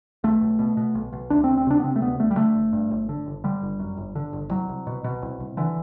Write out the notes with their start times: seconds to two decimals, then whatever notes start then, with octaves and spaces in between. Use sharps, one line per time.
0.24 B1 A3
0.41 B1
0.59 B2
0.77 B2
0.95 B1
1.13 B1
1.30 D2 D4
1.44 C4
1.49 D2
1.57 C4
1.67 C3 D4
1.79 B3
1.84 C3 C4
1.96 A3
2.01 D2 B3
2.20 D2 A3
2.31 G3
2.37 D3 A3
2.55 G1
2.73 G2
2.91 G1
3.09 D3
3.26 G1
3.44 D3 G3
3.62 G1
3.80 F#2
3.97 G1
4.15 D3
4.33 G1
4.51 C2 F#3
4.69 C2
4.87 B2
5.04 B2
5.22 C2
5.40 C2
5.57 D3 E3